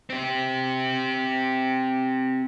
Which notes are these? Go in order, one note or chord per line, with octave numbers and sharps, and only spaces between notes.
C4 G4